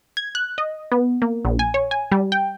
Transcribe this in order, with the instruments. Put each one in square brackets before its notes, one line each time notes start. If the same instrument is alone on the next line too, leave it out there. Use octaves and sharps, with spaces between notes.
[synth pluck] G#6
F#6
D#5
B3
A#3
A#1
G#5
C#5
G#5
G3
G5